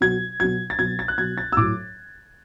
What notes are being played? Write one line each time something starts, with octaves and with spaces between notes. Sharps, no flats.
B2 F#3 G#6
B2 F#3 G#6
A6
B2 F#3 G#6
A6
F#6
B2 F#3 G#6
A6
E6
A2 F#3 D6